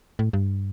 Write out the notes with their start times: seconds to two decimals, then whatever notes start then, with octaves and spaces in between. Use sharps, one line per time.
0.19 A2
0.33 G2